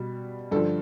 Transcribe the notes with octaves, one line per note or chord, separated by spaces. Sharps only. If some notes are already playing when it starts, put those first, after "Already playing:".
Already playing: B2 G3
G2 D3 F3 A4